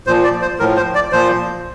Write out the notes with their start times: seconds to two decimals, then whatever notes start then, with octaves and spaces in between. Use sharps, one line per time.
0.07 A#2 F3 C5
0.24 D5
0.42 C5
0.59 A2 F3 A#4
0.76 C5
0.95 D5
1.12 A#2 F3 C5